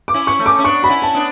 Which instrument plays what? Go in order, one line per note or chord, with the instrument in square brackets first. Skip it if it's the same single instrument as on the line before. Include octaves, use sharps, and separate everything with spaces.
[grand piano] D6
[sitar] C#4 E4
[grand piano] C#6
[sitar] A3 C#4
[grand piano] D6
[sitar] C#4
[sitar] B3 D4 [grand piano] C#6
[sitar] F#4 [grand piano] B5
[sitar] C#4 E4
[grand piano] A5
[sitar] B3 D4